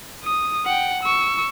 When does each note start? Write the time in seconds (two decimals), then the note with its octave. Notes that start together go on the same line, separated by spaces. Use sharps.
0.24 D#6
0.65 F#5 G5
1.03 C#6 E6